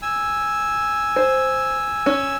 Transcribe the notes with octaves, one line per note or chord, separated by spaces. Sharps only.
G#5 E6
C5
C#4